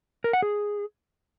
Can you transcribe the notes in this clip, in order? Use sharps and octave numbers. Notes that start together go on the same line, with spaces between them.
A#4
F#5
G#4